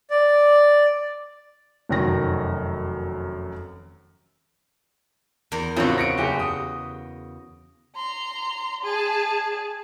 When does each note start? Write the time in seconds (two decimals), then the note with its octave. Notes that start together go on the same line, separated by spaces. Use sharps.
0.10 D5
1.89 F1 F#2 D#3 A#6
5.52 E2 A#4 C5
5.76 A1 C#3 F3 C4 F#4
5.98 A#6 C#7 D7
6.18 F#1 G4
6.39 D#6
7.96 A#5 C6
8.84 G#4 A5